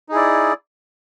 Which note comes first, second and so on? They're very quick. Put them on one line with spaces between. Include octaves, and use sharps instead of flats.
D#4 G#4 E4 D5